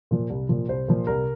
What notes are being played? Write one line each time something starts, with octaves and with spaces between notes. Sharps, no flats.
A#2 F3
C2
A#2 F3
C2 C5
A#2 F3
C2 A#4